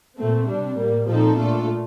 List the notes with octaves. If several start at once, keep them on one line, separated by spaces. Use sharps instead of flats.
A#2 A3 C4
C3 G3 D4
A2 G3 A#3
A#2 F3 C4 D#4 A4
A#2 A3 D4 F4 A4